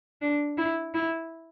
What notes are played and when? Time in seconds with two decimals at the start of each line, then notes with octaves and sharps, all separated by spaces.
0.21 D4
0.58 E4
0.94 E4